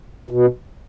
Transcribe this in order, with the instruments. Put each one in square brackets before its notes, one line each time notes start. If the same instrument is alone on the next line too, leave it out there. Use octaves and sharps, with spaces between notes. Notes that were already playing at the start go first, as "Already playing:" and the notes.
[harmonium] B2